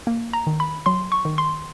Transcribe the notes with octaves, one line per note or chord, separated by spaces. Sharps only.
A#3
A#5
D#3
B5
F#3 C6
C#6
D#3
C6